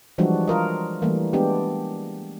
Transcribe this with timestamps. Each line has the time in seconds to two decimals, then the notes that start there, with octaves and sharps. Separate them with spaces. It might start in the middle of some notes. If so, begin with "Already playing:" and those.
0.18 E3 F3 G3 G#3 D4 F#4
0.47 F4 A#4 D#5
1.02 E3 G3 A3 A#3
1.33 G#3 B3 D4 G4